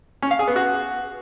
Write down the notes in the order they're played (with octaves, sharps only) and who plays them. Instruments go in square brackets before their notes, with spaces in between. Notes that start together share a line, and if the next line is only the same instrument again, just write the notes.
[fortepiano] C#4
F5
G#4
B3
F#4